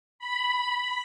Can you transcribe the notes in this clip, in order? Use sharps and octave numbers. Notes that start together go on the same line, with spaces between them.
B5
B5